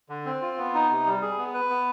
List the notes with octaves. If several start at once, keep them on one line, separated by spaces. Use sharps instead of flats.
D3
C4
F4
B3
D#4
C3
G3
G#4
B3
B4
B3